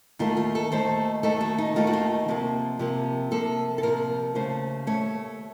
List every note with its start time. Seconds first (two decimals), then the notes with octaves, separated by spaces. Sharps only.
0.19 D#2 D#3 A3 F4
0.37 F4
0.55 A4
0.72 D#2 D#3 A3 C5
1.23 D#2 D#3 A3 A4
1.41 F#4
1.58 D#4
1.76 D#2 D#3 A3 F4
1.87 F#4
1.93 F4
2.28 C3 F3 A#3
2.79 C3 F3 A#3
3.31 C3 F3 A#3 A4
3.78 A4
3.83 C3 F3 A#3 A#4
4.35 D#2 C#3 A3 C5
4.87 C#3 A3 C#5
4.92 D#2